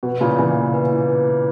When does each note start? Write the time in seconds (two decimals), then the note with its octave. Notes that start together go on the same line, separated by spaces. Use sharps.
0.03 B2 B4
0.21 A#2 C#3 E4
0.38 C#3 E3 A#3
0.56 A#3
0.74 B4
0.91 E4
1.09 B4
1.27 E4